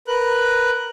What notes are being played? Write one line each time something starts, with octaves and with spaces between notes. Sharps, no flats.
A#4 B4 F#6